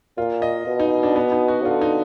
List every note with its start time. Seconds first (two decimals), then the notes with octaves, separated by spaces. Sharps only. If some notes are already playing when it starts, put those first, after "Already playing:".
0.18 A#2 F4
0.42 D#5
0.67 B2
0.79 D#4
1.03 D4
1.16 B3
1.32 D#4
1.48 F#4
1.65 D3 F4
1.81 D#4